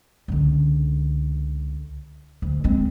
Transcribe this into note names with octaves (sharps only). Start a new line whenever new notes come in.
C#2 D3
D2
G#3 C4